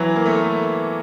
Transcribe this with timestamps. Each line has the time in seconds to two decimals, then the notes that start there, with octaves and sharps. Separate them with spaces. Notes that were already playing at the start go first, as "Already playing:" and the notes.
Already playing: E3 F#3
0.16 A#3
0.26 A3 B3